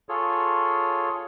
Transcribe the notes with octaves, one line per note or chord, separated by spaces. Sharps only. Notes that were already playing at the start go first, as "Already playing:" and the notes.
F4 G#4 A4 C#5